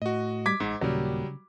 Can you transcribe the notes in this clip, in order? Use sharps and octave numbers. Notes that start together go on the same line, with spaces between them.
A2 F#4 D#5
G3 D6 G#6 B6
A1 G#2
D#2 A#2 C#3 F#3 G3